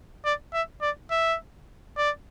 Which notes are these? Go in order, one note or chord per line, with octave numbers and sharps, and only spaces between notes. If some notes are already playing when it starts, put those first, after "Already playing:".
D5
E5
D5
E5
D5